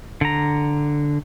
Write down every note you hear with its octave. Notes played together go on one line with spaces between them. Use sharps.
D3 A#5